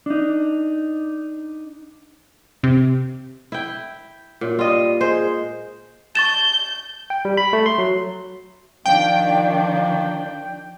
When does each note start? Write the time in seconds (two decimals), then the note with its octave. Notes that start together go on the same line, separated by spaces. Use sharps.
0.06 D4 D#4
2.63 C3
3.52 E4 G5
4.41 F#2 A#2
4.59 G3 F4 D#5
5.01 G#3 C5
6.15 A5 C#6 G6 A6 E7
7.10 G5
7.25 G3
7.37 B5
7.53 A3
7.66 C6
7.78 F#3
8.86 D#3 F3 D4 F5 G5